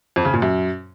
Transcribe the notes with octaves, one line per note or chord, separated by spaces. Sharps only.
F2
C#3
A#2
F#2